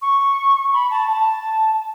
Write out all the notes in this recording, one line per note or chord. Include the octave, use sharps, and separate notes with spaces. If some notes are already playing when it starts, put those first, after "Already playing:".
C#6
B5
A5
A5